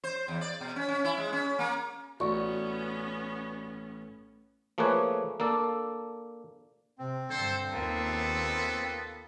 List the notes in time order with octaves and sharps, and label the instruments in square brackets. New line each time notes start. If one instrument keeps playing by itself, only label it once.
[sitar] C5
E2
D5
B2
C#4
C#4
E4
G#3
C#4
A#3
[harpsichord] A1 [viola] B3 C#4 [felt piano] F#4 D5 C#6
[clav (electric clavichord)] F3 A3 A#3 G#4 B4 C#5
A#3 D4 A4
[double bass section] C3 [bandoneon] C4
[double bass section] G2 D3 [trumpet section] A4 C5
[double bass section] D#2 [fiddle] A#3 F4 [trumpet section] B3 A4